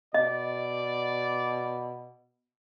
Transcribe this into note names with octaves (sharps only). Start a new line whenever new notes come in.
B2 D5 D#5